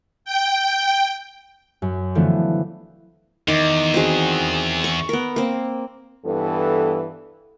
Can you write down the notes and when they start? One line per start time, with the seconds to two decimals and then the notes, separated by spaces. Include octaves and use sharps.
0.25 G5
1.82 F#2
2.15 D3 E3 F3 A3 B3 D4
3.48 E2 D#3 D6
3.94 C4 F#4 G#4
4.84 C#6
5.09 B3 A#4
5.36 A#3 C4
6.25 G2 E3 B3 A4